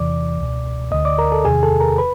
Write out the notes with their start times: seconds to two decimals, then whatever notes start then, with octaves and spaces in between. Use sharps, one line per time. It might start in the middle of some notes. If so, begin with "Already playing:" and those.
Already playing: E2 C3 E3 D5 D6
0.39 C#2 B2
0.91 D2 D3 D#5 D#6
1.05 D5 D6
1.18 A#4 A#5
1.32 A4 A5
1.45 E2 C3 D#3 G#4 G#5
1.63 A4 A5
1.80 A#4 A#5
1.98 B4 B5